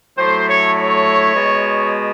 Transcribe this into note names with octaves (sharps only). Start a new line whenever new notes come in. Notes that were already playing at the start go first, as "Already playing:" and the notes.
A2 F#3 A3 C5
C#5
C#5
B2 G#3